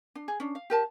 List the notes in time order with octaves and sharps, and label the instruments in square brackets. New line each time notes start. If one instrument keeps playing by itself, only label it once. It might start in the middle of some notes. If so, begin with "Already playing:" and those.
[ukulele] D4
G#4
C#4 D4
F5
G4 A#4 A5